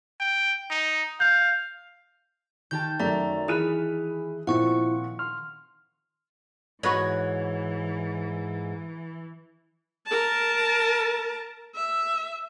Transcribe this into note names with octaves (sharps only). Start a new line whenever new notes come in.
G5
D#4
F5 G6
D#3 G4 A5 G6
F#2 A3 D5 E5 A#5
E3 G#4 B5 F6 F#6 D#7
A#2 F3 C4 E4 F#5 C#6
C6 F6
G#2 E3 F#4 B4 C#5 D#5
A#4 A5
E5